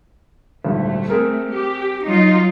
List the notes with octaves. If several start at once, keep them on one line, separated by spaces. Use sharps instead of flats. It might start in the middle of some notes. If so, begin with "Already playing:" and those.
D#1 G#1 D2 A3
C4 G#4 A#4
G4
F#3 D#4 F4